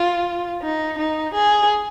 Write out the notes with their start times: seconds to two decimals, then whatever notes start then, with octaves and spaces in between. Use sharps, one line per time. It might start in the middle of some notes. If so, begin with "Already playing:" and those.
Already playing: F4
0.62 D#4
0.98 D#4
1.34 G#4